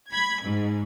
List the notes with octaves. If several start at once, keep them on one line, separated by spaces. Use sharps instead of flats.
B5 G#6
G#2